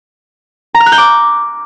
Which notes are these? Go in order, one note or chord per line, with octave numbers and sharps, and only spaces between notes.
A#5
F6
F#6
G6
D6